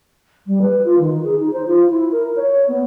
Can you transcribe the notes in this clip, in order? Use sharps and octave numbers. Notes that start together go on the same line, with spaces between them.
G3
B4
F4
D#3
G#4
D#4
C5
F4
E4
A#4
C#5
B3